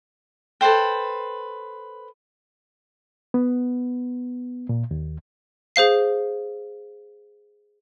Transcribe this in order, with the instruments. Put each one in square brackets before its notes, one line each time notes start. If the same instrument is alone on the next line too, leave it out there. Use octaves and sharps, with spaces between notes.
[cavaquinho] A4 B4 C5 G5
[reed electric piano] B3
A#2
D#2
[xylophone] G#4 C5 F5 C7